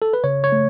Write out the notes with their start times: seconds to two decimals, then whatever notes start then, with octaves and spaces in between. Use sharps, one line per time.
0.02 A4
0.13 B4
0.24 C#3 C#5
0.44 C#5
0.52 A3